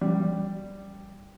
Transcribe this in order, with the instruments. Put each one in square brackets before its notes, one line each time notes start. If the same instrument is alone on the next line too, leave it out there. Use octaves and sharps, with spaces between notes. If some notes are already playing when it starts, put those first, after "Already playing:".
[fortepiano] G3